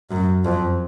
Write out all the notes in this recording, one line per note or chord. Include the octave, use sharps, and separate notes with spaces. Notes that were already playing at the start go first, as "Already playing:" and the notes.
F#2
F2